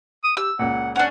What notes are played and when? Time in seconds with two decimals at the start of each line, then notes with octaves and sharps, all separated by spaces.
0.24 D#6
0.37 G4 E6
0.59 C#2 A#2 F#5
0.96 C#4 D4 F#5